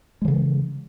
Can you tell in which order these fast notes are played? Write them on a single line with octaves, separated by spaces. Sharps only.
G#3 E3 C#3